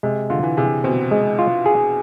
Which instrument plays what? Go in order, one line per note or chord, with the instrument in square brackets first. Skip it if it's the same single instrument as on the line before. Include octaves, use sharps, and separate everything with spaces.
[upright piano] C3 [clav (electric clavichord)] G#3
[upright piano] D3 [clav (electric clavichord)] F4
[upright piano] E3
[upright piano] C3 [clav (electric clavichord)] G#4
[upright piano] B2 [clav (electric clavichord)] C4
[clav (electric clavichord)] G#3
F4
G#4